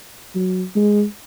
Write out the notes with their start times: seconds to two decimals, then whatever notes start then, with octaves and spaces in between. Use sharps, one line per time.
0.35 F#3
0.76 G#3